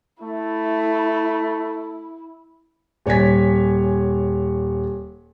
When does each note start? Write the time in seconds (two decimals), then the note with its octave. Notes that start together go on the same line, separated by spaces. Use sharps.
0.23 A3 E4
3.06 D#1 C#5 G#5 G#6 B6